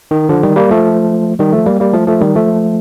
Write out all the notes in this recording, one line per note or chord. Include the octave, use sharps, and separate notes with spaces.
D#3
D3 F3
D#3 G3
G3 A#3
F3 A3
D#3 G3
F3 A3
G3 A#3
G3 A#3
F3 A3
F3 A3
D#3 G3
F3 A3